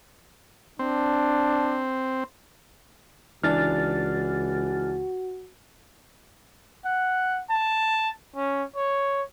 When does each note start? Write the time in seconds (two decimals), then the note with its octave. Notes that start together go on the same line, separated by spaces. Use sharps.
0.79 C4 D4
3.43 C#2 E3 D4 F#4 F6 A6
6.85 F#5
7.50 A5
8.36 C#4
8.76 C#5